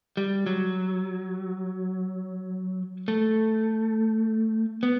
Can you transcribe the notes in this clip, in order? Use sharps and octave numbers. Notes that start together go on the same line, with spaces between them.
G3
F#3
A3
B3